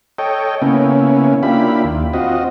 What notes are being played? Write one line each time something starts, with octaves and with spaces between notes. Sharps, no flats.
A4 C#5 D#5 G5
C#3 A#3 B3 C#4 E4
A#3 D4 E4 F4 G4 B5
D#2
C4 F4 F#4 D#5